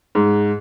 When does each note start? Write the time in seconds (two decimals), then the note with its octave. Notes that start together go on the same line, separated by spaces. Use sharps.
0.15 G#2